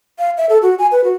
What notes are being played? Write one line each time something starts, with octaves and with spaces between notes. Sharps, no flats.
F5
E5
A4
F#4
G#5
B4
F#4